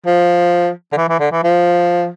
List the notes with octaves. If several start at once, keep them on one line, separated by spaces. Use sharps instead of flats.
F3
D3
E3
E3
D3
E3
F3